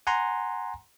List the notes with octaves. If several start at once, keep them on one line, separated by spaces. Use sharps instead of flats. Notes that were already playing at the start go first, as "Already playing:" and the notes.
F#5 G#5 A#5 C6